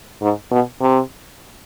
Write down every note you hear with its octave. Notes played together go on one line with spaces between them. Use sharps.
G#2
B2
C3